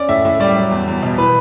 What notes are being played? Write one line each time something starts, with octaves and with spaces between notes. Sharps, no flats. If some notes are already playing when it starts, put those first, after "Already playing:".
Already playing: C#4 D5
A2 E5
A2 E5
G3 D5
F#3
E2
E2
B2
E3 B4